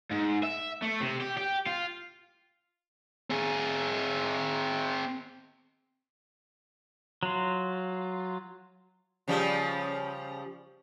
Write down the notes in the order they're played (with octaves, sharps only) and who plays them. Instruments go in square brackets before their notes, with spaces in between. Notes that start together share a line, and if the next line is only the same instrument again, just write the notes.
[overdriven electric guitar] G#2
E5
A3
C3
G4
G4
F4
[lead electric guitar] C4 G#4
[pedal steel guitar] F#3 F4
[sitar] C#3 F3 G3